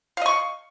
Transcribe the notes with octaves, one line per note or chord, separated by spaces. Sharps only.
D#5 F5 C#6